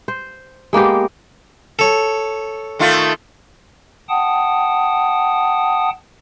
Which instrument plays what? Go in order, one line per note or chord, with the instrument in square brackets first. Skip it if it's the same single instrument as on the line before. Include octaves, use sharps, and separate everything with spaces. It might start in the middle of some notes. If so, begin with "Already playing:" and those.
[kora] C5
G#3 A#3 B3 G4
[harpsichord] A4 C#5
[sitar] D#3 A3 F4
[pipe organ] F#5 G5 A5 D#6